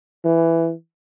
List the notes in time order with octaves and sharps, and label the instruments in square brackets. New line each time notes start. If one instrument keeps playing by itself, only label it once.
[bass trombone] E3